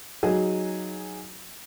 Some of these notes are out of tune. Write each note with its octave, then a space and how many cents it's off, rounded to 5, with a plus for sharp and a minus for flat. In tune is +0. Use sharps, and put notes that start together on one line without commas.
F#3 +0 D#4 +0 G#4 -5